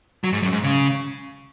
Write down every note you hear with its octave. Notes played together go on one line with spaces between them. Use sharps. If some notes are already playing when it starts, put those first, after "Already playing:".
F#3
G#2
F#2
G#2
C#3